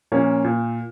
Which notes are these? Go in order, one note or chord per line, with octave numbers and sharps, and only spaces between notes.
A#2 F3 A#3 C#4
A#2